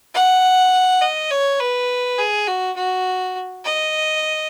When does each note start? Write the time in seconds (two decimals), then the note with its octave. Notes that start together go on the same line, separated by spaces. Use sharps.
0.14 F#5
1.01 D#5
1.31 C#5
1.60 B4
2.18 G#4
2.47 F#4
2.76 F#4
3.64 D#5